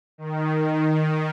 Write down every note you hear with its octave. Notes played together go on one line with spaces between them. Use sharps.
D#3